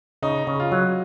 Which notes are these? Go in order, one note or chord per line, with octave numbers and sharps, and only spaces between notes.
C#3 D#4
C#3
F4
F#3